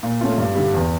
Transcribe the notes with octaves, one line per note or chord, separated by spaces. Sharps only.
A#2
A3 C#4 F4
G2
D3 G3
E2